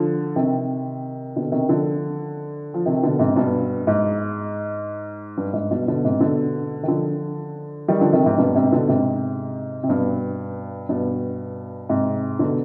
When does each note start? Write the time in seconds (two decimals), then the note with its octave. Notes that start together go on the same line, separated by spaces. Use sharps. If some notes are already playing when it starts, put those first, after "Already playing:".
Already playing: D3 F3
0.36 C3 D#3
1.36 B2 D3
1.52 C3 D#3
1.69 D3 F3
2.74 F3
2.86 C3 D#3
3.03 B2 D3
3.19 G#2 C3
3.36 G2 B2
3.87 G#2
5.37 G2
5.53 G#2
5.71 G2 B2
5.88 B2 D3
6.04 G#2 C3
6.20 B2 D3
6.83 D#3
6.88 D3 F3
7.88 D#3 G3
8.00 D3 F3
8.13 C3 D#3
8.25 G#2 C3
8.38 G2 B2
8.55 G#2 C3
8.72 B2 D3
8.89 G#2 C3
9.83 C3
9.89 G2 B2
10.89 G2 B2
11.89 G#2 C3
12.39 B2 D3